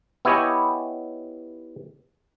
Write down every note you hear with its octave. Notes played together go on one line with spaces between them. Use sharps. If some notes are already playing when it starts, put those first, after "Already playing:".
B3 E4 G4 C#5 D#5 G#5